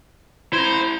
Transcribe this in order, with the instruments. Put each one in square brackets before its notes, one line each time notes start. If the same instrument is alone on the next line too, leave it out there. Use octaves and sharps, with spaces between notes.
[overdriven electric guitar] E4 A#5 [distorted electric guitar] C5